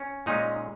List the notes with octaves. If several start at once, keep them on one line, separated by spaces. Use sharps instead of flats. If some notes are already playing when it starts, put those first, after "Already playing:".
Already playing: C#4
A#2 G#3 C#4 D#4